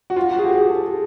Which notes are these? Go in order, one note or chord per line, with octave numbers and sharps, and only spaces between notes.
F#4
F4
F#4
G#4
G4
G#4
A4
G#4